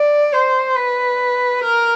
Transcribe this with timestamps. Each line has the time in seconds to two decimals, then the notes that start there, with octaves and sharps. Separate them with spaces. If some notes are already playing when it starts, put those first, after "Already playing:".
Already playing: D5
0.33 C5
0.76 B4
1.64 A#4